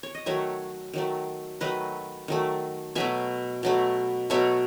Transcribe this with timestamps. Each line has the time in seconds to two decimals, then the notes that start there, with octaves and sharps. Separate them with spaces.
0.03 C#5
0.15 D#5
0.26 D#3 F#3 A3 C#5 E5
0.93 D#3 F#3 A3
1.61 D#3 F#3 A3 B4 D#5
2.28 D#3 F#3 A3
2.95 B2 F#3 A3 E5 G#5
3.63 B2 F#3 A3
4.30 B2 F#3 A3 C#5 E5